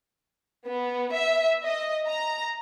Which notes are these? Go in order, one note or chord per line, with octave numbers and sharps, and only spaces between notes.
B3
E5
D#5
A#5